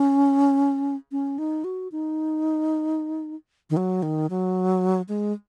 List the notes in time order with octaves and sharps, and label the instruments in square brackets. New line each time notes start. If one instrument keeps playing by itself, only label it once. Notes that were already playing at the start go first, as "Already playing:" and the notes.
Already playing: [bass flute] C#4
C#4
D#4
F#4
D#4
D#3
F#3
D#3
F#3
G#3